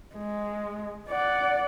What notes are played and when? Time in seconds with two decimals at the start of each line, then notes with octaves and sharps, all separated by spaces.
0.15 G#3
1.09 D5 F#5